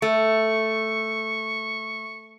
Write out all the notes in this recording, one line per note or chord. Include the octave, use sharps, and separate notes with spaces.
A3 C#6